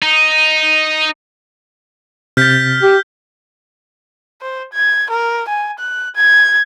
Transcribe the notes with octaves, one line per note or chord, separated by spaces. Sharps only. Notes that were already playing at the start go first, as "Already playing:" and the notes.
D#4
C3 F6 G6 A6 B6
G4
C5
G#6
A#4
G#5
F#6
G#6